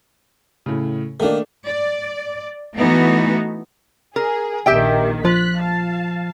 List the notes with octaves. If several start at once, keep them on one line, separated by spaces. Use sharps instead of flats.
A2 C#3
D#3 A3 A#3 D4
D5
E3 A3 B3 D#4 F#4
G#4 A#4
A#1 D#2 D#3 G4 E5 G5
F3 F4 F#6 B6
F5 A5